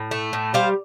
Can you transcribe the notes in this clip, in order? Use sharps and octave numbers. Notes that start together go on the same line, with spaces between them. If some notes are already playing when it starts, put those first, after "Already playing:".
Already playing: A2
A3
A2
G3 C5 F5